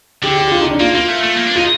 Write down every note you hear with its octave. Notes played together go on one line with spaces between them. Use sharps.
D3 G4
G4
G4
F4
D#4
D4
A#3 F4
A#3 F4
A3
A3
A#3
D4
D#4 F4